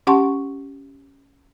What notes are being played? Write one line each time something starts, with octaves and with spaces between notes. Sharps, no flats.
C#4 G4 F#5 A5 C6 C#6